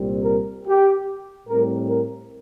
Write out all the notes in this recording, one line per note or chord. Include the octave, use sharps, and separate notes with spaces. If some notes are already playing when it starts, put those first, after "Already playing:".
Already playing: C2 A#2 G3 C4
A#4
G4
A2 G3 C4 A#4
A#4